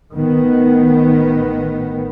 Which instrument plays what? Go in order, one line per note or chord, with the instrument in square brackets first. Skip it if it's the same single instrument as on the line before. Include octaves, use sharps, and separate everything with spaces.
[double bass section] A1 D#3 B3